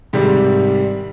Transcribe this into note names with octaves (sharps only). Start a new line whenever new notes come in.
G#2 C3 D#3 G3